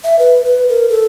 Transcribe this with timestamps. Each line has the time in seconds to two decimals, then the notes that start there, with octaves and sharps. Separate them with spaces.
0.04 E5
0.19 B4
0.45 B4
0.69 A#4
0.89 A4